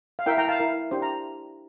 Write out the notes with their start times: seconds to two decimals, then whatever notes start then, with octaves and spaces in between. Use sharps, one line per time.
0.19 F5
0.26 E4 A#4 E5 G5
0.38 G5 A#5
0.48 F5 A5
0.60 E4 A#4
0.91 D4 G4 C5
1.02 A#5